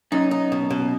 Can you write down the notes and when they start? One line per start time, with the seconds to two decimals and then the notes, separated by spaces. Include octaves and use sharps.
0.12 F#2 D#4
0.31 D#4
0.52 B2
0.70 B2